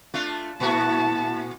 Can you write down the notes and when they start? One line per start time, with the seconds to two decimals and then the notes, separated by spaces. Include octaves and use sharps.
0.14 A3 D4 F4
0.60 A#2 A3 E4 F#4 A5